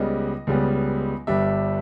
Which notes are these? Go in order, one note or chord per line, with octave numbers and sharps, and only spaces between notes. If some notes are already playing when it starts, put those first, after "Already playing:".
Already playing: C#2 C#3 G3 B3 D#5
C#2 C#3 G3 B3
G1 G2 G3 E5